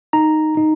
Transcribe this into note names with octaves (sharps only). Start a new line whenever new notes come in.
D#4 A#5
D#4